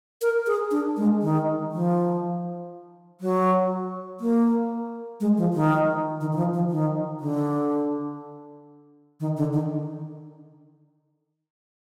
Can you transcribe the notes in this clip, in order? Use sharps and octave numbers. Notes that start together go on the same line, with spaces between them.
A#4
G#4
D4
G#3
D#3
F3
F#3
A#3
G#3
F3
D#3
D#3
D#3
F3
F3
D#3
D3
D#3
D3
D#3